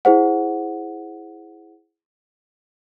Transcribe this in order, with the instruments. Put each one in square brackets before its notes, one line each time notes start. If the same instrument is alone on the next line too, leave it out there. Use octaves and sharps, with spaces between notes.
[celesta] E4 G#4 C5 F#5